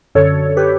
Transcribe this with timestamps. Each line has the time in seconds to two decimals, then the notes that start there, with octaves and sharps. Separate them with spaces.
0.15 F#2 D3 A4 C#5
0.57 G4 B4